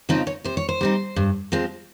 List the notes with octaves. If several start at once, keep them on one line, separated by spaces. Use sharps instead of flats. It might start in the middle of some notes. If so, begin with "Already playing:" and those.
C#3 F3 C4 D#4 D#5
C#5
C3 C5
C#5
C5
G3 C4 D#4
G2
F3 G#3 C4